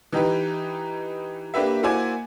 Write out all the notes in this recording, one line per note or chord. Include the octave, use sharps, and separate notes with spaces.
E3 D#4 G4 B4
A#3 D4 G4 B4 E5
A#3 E4 F#4 C5 D5 G#5